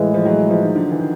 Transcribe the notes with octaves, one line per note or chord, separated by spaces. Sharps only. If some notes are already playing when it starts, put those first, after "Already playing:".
Already playing: A2 E3 F3 G#3
F3
F#3
F3
D#3
D3
E3
D#3